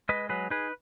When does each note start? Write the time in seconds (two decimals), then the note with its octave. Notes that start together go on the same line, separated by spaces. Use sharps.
0.09 G#3 B4 D#5
0.29 F#3 G#4 B4
0.50 D#4 G#4 B4